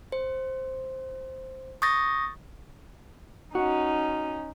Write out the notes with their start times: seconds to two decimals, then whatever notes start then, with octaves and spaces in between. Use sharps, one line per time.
0.12 C5
1.82 C#6 D#6 G6 A6 A#6
3.55 C#4 D#4 F#4